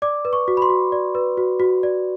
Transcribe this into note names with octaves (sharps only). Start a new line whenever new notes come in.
D5 D6
B4
C#6
F#4
B5
C6
F#4
D5
B4
F#4
F#4
D5